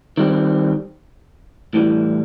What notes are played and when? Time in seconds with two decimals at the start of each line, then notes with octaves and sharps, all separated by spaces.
0.17 D#3 G3 C4
1.74 A2 E3 G3